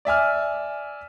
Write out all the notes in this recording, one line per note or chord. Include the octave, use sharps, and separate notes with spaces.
D5 E5 G#5 F6